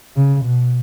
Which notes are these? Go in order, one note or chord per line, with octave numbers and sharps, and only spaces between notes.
C#3
B2